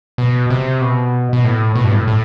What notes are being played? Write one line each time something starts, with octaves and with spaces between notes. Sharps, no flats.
B2
C3
B2
B2
A2
B2
G2
A2
A2